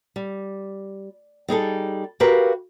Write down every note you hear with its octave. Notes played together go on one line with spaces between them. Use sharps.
G3
G3 D#4 G#4 A4
F#4 G4 A#4 B4 F5